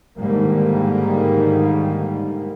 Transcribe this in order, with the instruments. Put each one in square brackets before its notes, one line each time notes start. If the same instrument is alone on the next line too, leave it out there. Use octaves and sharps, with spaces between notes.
[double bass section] G#2 D3 D#3 G3 A#3